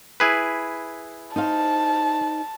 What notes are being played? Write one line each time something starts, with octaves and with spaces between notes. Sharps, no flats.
E4 G#4 B4
D#4 C5 F5 A5